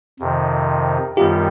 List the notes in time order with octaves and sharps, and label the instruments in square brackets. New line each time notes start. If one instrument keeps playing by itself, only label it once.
[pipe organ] F2 C3 D#3
[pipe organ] F#2 D#3 G3 B3 [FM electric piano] F4 G4